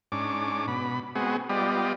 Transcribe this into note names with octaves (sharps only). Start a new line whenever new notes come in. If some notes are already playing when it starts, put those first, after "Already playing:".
G#2 C#4 D4 D6
B2 B5
G#3 B3 C4 F#4 G#4
G3 B3 F4 G4 D5 D#5